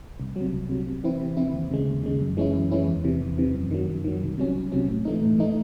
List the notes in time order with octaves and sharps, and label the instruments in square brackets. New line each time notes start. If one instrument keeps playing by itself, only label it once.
[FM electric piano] C2
F#3
C3
C2
C3 F#3
C3
E3 C4 E4
C3
E3 C4 E4
D#2
C#3 G#3
D#2
C#3 G#3
F#2
E3 G#3 C#4 E4
F#2
E3 G#3 C#4 E4
E2
C3 E3
E2
C3 E3
F#2
D#3 F#3
F#2
D#3 F#3
C2
C3 F#3 C#4
C2
C3 F#3 C#4
A2
E3 A3 D#4
A2
E3 A3 D#4